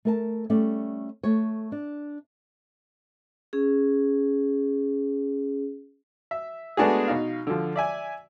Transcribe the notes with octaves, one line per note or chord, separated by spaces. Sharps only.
A3 A#4 A5
G3 A3 C#4 D5
A3 C#5
D4
C#4 G#4
E5
G#3 A3 B3 D4 F#4 G#4
B2 D#4 F5
D3 F3
D5 E5 G#5